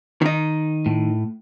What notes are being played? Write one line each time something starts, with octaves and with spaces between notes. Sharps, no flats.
D#3 D#4
A2